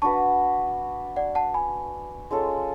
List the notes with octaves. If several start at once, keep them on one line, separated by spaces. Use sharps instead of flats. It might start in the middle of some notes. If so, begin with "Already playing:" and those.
D4 F#4 B4 A5 C#6
D5 F#5
F#5 A5
G#5 B5
G#3 C#4 F4 A4